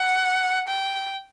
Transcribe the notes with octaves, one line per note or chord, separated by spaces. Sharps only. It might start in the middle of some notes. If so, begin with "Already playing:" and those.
Already playing: F#5
G5